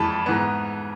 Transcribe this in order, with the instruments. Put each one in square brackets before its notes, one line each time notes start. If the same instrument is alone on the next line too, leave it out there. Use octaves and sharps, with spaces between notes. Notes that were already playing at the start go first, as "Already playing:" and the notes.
Already playing: [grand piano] F2 E3 G#3 A5 B5
G#2 E3 B3